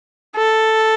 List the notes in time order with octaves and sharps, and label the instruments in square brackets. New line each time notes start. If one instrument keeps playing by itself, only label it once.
[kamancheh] A4